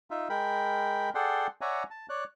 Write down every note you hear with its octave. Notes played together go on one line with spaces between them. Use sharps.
D#4 F4 E5
G#3 A#4 G5 B5
G#4 A4 D5 F#5 G5 C6
C#5 D5 E5 F#5 G#5 A#5
A5
C#5 D5 F#6